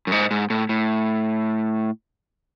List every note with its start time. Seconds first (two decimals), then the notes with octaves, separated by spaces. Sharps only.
0.07 F#2
0.12 G#2
0.31 G#2
0.50 A2
0.69 A2